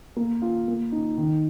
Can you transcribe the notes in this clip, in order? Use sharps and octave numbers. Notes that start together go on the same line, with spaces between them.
A#3
F4
A#3
D#4
D#3